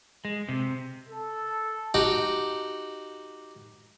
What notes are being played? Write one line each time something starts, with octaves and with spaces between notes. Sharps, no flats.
G#3
C3
A4
D#4 F#4 G4